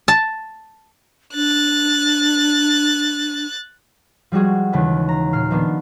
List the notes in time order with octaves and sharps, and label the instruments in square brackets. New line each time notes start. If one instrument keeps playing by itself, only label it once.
[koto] A5
[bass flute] D4 [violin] F#6 A6
[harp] F3 G3 G#3 F#4 G#4
D#2 C#3 E3 A3
A#5
A#2 F6 C7
D#3 F3 A#3 B3 D4